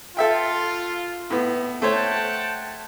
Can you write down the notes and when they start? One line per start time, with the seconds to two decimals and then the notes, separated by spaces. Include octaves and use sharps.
0.17 F4 A4 E5 G5
1.30 A2 B3
1.82 A3 C5 C#5 F#5 G5 A5